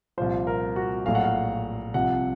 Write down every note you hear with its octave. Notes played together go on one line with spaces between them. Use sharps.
C2 A#2 F3 C5
A#4
F#4
A#1 A2 F#3 F5
F#5
F5
C2 C3 F3 F#5